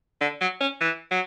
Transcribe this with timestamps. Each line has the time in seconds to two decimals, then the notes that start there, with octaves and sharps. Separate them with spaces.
0.21 D3
0.41 F#3
0.61 C#4
0.81 E3
1.11 F#3